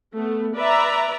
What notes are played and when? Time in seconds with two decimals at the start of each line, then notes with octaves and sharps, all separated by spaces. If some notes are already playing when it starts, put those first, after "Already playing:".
0.16 A3 B3
0.56 B4 D5 E5 A#5